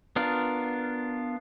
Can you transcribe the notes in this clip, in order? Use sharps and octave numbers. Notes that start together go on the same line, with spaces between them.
B3 D4 F4 A#4